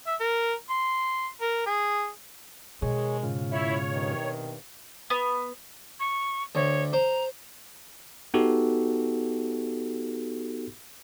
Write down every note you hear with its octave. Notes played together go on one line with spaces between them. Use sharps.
E5
A#4
C6
A#4
G#4
B2 D#3 G#3 G#4 C#5
G#2 C#3 F4
E4 C#5
G2 C3 D#3
B3
C#6
D2 C#5
C5 A#5
B3 D#4 F#4 G4 A4